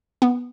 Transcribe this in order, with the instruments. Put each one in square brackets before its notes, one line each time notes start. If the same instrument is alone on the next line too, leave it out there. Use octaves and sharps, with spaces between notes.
[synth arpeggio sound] B3